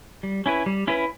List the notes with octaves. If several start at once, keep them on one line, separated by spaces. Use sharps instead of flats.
G3
C#4 E4 B4
G3
C#4 E4 B4